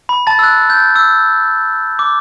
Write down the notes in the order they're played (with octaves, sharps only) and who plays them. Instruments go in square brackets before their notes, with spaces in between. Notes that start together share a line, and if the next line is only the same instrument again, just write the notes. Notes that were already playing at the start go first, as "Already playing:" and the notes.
[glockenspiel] B5
A5 A6
E6
F#6
G6
E6
D6